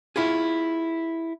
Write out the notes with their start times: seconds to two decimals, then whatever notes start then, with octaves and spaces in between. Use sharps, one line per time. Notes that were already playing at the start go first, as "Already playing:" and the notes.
0.16 E4 F4 G#4